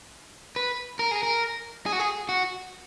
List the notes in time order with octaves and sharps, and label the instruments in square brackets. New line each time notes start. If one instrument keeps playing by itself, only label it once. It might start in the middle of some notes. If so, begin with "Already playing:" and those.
[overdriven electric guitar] B4
A#4
G#4
A#4
G#4
F#4
G#4
F#4